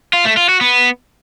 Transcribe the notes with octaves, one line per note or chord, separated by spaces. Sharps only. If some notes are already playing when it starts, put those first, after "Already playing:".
F4
A3
F4
F#4
B3